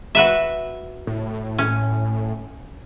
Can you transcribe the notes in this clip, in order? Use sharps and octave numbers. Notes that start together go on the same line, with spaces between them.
F#4 B4 E5
A2
C#4